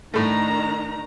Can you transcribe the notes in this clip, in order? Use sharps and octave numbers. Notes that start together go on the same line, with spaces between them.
A2 D#3 A3 D4 A#5